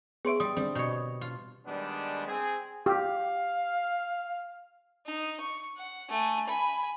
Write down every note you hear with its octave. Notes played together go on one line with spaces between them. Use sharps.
B3 G#4 C#5 E5 C6 D7
G3 D#6
D3 G3 C4
B2 C#5
F4
D#3 G3 G#3 B3 D4
C4 G#4
G4 F5
D#4
C#6
F#5
A3 G#5
G#5 B5